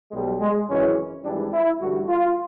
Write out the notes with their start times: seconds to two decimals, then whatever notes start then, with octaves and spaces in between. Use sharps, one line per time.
0.12 B1 B2 G3 G#3
0.40 G#3
0.68 G#1 F#2 C#3 E3 G#3 C#4
1.24 G#1 G#2 E3 G3 D4
1.53 E4
1.80 A1 G2 D3 G3 F#4
2.08 F4